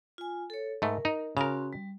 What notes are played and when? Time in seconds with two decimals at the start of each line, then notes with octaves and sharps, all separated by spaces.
0.18 F4 G#5
0.50 A4 C#5
0.82 G#2 A3 A#4
1.05 D#4
1.37 C#3 C#4 F#4 A#4 C6
1.73 G3